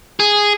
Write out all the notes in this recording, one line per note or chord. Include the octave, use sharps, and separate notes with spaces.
G#4